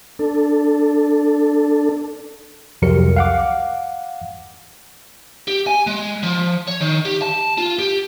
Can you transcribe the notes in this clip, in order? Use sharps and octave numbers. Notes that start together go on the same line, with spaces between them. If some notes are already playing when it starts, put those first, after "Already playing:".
D4 A4
C2 F2 C3 F#3 A#4 C#7
F5 F#5 D6
G4
G#5
G#3
F3
C#5
D#3
G4
A5
F4
G4